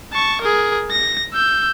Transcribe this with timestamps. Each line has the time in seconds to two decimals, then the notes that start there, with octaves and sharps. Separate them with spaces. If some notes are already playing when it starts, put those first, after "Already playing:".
0.13 A5 C#6
0.42 G#4 A#4
0.91 A#6
1.33 E6 G6